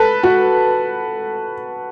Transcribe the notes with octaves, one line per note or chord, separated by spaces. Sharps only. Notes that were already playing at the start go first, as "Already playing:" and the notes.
Already playing: A4 B4
F#4